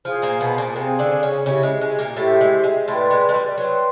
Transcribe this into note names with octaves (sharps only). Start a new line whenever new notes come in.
F3 G#4 C5 F5 G#5
A#2 A#3
B2 B3
A#2 A#3
C3 C4 G#4 C5 F5 G#5
D3 D4
C#3 C#4
C#3 C#4 E4 G4 C5 E5
G#3
G#3
A#2 A#3
A2 A3 E4 G4 C5 E5
G#3
G#3
A2 A3 B4 D5 G5 C6
G#3
G#3
G3
F#3 B4 D5 G5 C6